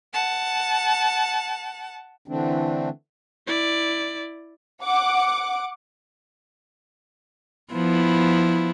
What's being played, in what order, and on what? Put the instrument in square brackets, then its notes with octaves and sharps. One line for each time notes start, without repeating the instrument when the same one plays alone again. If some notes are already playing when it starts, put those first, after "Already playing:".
[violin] F#5 A5
[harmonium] D3 E3 A3 C4 D4
[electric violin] E4 D5
[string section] F#5 D6
[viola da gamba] F3 B3 E4